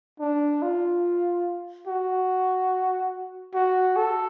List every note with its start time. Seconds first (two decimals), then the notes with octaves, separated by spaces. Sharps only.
0.20 D4
0.62 F4
1.87 F#4
3.54 F#4
3.96 A4